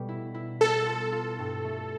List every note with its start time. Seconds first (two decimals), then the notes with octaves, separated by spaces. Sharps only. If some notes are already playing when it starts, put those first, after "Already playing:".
Already playing: B2 G3 A3
0.09 E4
0.34 E4
0.61 B3 A4
0.86 F4
1.12 F4
1.38 G2
1.64 A3